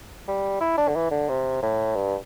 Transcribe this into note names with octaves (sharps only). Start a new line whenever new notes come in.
G3
E4
D4
D3
E3
D3
C3
A2
G2